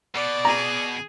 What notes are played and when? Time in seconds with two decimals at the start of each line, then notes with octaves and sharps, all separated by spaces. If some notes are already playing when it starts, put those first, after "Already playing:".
0.14 B2 D5
0.45 G#4 A#5